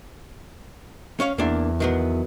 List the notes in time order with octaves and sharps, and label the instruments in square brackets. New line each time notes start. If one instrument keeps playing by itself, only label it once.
[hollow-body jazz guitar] C#4 C#5 F5
[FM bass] E2 [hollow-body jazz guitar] A#3 D4
[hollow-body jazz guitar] D#3 F#3 B3